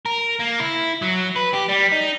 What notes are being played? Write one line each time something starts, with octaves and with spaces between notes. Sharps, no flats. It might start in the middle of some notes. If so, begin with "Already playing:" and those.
A#4
A#3
E4
F#3
B4
G4
G3
D#4